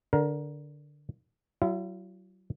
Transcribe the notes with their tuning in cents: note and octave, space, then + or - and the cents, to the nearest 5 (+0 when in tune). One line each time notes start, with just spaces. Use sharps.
D3 +0 A#4 +20
F#3 +30 F4 -45 E5 -10